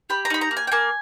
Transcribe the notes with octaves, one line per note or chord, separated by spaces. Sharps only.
G4 B5
A#5
D#4 B5
A#5
A#3
G#5
G5
A#3 G#5